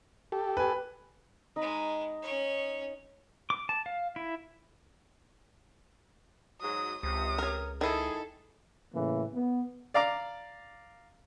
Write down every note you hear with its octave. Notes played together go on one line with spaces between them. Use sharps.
G4 A4
B4 G#5
G#3 D#4 B4
C#4 C#5
D6
A5
F5
E4
G#2 F#3 D#6
C#2 C3 D#6
A#4 C#5
D#3 D#4 E4 G#4 A4
A2 C#3 E3 A#3
B3
D5 F5 A#5 D6